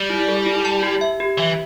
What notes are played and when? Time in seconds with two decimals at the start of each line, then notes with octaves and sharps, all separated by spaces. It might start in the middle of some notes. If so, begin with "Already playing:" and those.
Already playing: G3 D5
0.10 E4
0.28 A4
0.46 E4
0.65 A5
0.83 G4
1.01 E5
1.20 G4
1.38 E3 E5